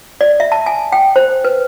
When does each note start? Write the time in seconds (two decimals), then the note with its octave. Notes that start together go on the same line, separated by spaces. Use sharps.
0.21 D5
0.40 E5
0.52 A5
0.66 G#5
0.92 G5
1.16 C5
1.44 B4